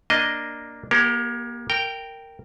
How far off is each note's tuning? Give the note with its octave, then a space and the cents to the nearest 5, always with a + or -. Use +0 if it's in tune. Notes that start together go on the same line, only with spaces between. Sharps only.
A#3 +0 D4 +0 D#5 +0
A#3 +30 G4 +0 A#4 -20
A#4 -15 G5 +0